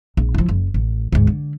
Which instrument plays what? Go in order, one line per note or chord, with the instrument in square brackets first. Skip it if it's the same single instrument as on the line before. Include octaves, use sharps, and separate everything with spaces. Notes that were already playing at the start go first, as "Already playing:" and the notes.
[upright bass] A#1
F3 E4
F#1
A1
D2 G#2
D3